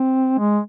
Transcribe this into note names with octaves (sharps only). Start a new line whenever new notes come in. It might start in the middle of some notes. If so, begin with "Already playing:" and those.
Already playing: C4
G#3